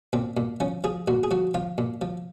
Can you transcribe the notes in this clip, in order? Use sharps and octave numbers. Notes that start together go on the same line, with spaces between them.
A#2 C4
A#2
F3 C#4
F3 G#4
A#2 F#4
G#4
F3 F#4
F3 F4
A#2
F3